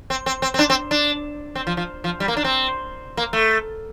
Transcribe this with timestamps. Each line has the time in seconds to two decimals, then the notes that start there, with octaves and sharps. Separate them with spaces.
0.10 C4
0.26 C4
0.42 C4
0.54 C4
0.59 D4
0.70 C4
0.91 D4
1.55 C4
1.67 F3
1.77 F3
2.04 F3
2.20 G3
2.28 A#3
2.37 D4
2.44 C4
3.17 A#3
3.33 A3